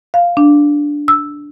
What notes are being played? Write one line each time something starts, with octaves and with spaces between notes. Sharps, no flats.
F5
D4
E6